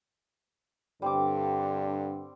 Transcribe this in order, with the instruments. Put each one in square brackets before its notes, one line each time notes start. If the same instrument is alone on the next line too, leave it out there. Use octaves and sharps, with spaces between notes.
[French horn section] G2 D3 [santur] G3 C4 D6